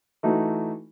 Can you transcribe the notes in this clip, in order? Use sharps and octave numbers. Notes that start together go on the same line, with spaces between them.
E3 A3 D#4 F#4